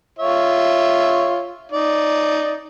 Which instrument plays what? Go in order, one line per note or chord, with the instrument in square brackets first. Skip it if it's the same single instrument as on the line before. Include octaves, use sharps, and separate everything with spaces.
[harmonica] F4 C#5 E5
D#4 D5